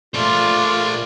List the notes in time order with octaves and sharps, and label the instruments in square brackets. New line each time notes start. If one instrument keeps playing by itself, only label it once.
[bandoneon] A3 D5 [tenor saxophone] F4 [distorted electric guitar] A#4 C5